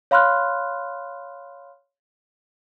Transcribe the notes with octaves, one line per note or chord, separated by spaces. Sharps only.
C#5 F5 B5 C6 F6 F#6